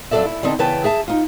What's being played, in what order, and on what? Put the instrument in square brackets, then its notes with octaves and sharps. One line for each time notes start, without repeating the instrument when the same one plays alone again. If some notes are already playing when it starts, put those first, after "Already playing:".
[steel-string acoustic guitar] F2 F#3 G#4 A4 D5 E5
E4
D3 B3 C4 D#4 A5
C#3 E3 B3 B4 G5 A5
G#4 E5 A5
D#4 F4